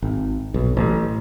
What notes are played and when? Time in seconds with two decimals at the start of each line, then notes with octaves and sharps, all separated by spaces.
0.02 G#1
0.54 B1
0.77 A1